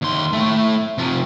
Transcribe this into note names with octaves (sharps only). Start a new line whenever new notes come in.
D#2 C6
A3 E4
C3 F3